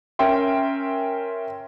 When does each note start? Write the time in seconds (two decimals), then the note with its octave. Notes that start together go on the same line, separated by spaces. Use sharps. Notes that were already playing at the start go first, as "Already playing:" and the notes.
0.19 C#4 A#4 E5 G5 C6